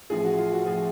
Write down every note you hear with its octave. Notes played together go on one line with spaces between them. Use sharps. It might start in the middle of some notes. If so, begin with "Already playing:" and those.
A1 A2 F3 G#4
F#4
F4
F#4
A2 F3 G#4